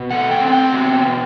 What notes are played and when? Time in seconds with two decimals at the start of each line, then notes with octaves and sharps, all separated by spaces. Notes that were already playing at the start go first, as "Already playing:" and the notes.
Already playing: B2
0.10 A3 F#5
0.31 G5
0.41 C4
0.46 F#5
0.52 G5
0.72 B2
1.04 B2